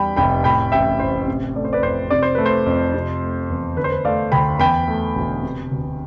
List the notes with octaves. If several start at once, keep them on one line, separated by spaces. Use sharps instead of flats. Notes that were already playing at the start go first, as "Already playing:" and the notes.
Already playing: E2 G3 G5 B5
F1 G5 B5
A2 G5 B5
A1 E5 G5
A1 C5
C3
A3 D5
C5
B4 D5
F2 C5
C3 D5
C5
A3 B4
C5
F2
C3
A3
E2
D3 B4
C5
B4
A3 D5 F5
D2 G5 B5
E2 G5 B5
A3
E1
C3
D2